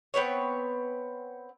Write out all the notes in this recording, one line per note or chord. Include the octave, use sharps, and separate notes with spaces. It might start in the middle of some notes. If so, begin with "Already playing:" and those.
B3 C4 B4 C#5